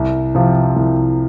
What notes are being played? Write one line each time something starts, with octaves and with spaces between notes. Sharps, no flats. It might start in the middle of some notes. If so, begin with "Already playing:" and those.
Already playing: C2
C3 F3
C2